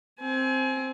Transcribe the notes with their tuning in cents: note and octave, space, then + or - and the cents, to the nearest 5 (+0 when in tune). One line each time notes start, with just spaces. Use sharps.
C4 +5 G#5 +30